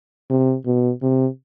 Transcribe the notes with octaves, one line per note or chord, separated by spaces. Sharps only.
C3
B2
C3